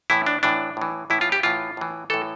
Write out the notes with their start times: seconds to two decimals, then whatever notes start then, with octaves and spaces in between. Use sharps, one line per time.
0.10 A2 E3 E4
0.26 D4
0.43 A2 E3 D4
0.77 A2 E3
1.10 A2 E3 E4
1.21 F4
1.32 G4
1.43 A2 E3 F4
1.77 A2 E3
2.10 A2 E3 A4